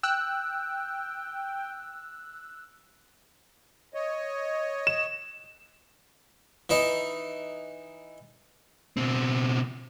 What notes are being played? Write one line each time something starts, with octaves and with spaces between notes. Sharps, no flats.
G5 E6 F#6
C#5 D#5
E7
E3 D#4
B2 C4